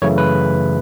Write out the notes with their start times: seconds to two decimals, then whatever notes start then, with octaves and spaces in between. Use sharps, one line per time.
0.02 F#2 C#3 E3 A3 C#5
0.18 B4